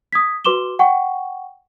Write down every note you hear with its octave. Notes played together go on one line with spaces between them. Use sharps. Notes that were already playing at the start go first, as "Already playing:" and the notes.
D#6 G#6 B6
F#4 B4 C6 D6 E7 G7
F#5 G5 C#6